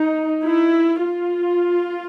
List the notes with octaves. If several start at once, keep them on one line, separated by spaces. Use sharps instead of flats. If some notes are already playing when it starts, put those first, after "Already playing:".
Already playing: D#4
E4
F4